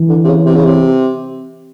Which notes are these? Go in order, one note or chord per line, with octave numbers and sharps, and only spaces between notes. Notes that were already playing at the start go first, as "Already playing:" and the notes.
Already playing: E3
D3
C3
C#3
C3
C#3
C3